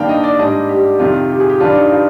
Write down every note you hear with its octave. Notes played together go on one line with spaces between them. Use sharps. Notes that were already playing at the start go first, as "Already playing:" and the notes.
Already playing: G2 D#3 A#3 D4 F5 G5
D#5
D5
G#2 G3 D4 D#5
G4
F2 C3 D#3 F4
G4
G#4
G4
G2 D#3 G3 D4 F4
D#4
F4